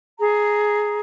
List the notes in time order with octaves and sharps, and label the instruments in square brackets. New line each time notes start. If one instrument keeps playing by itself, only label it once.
[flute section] G#4 A#5